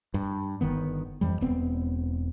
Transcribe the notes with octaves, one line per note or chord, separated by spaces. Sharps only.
G2
G1 D#3 B3
F2 E3 G3
E1 B3 C4